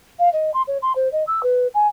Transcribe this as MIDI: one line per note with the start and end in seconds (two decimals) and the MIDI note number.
0.19 0.31 77
0.32 0.50 75
0.53 0.62 84
0.67 0.77 73
0.82 0.92 84
0.95 1.10 72
1.12 1.23 75
1.27 1.43 88
1.43 1.67 71
1.74 1.87 80